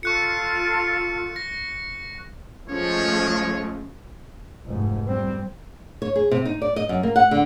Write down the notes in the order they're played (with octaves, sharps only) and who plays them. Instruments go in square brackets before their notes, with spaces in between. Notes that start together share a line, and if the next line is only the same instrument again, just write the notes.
[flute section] F4 A4 [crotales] C#6 F#6 C#7
[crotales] A#6
[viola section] F3 G#3 A3 [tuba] C#4 [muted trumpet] C#5
[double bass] F1 G#2
G3 C4
[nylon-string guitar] C#5
G#4
C3
D#4
D5
D#5
F#2
A#3
F#5
D3